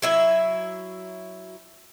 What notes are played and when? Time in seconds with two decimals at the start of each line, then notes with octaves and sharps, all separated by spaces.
0.02 F#3 E4 E5